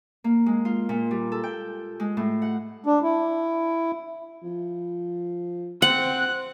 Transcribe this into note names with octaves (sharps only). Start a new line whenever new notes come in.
A#3
G#3
F4
A#2
G3
A4
G5
G#3
A2
F#5
D4
E4
F3
C4 F#5 F#6